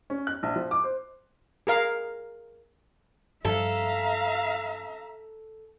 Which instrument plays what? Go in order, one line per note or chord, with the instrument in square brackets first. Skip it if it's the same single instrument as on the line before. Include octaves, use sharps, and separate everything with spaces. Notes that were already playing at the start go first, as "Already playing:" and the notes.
[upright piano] C#4
F#6
A#1
F3
D6
C5
[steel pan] G#4 A#4 F5
[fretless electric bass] G2 F3 G3 [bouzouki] A4 [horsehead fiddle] E5 A#5 [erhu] F5